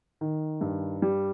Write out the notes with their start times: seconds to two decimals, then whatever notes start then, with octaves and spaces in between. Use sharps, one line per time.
0.21 D#3
0.61 G2
1.02 G3